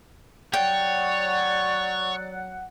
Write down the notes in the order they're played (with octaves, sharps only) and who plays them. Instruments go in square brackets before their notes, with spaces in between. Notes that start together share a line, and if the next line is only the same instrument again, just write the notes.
[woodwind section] F#3 F#5 [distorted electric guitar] C#5 [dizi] D5 [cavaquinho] G5